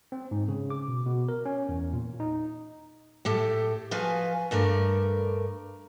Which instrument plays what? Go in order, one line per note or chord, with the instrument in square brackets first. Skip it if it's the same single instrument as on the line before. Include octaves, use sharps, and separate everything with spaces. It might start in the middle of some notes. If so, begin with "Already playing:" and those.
[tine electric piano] C4
G#2
C#3
D6
B2
B2
A#4
C#4
E2
A#2
D#4
[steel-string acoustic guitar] A2 G4 A4
F3 F#4 B4 F5 G#5
G2 A3 A#4 D5